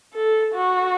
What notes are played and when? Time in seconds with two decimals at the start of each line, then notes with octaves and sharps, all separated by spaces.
0.14 A4
0.55 F#4